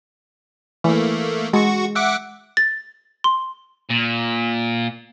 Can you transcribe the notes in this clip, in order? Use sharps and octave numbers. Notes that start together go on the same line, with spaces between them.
E3 A3 A#3
G#3 F#4 C#6
E5 F#5 D6
A6
C6
A#2